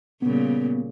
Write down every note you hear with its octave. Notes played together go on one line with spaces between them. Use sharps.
A#2 C#3 G3 B3